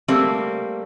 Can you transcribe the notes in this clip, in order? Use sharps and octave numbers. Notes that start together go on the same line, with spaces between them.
G3 A3 A#3 C4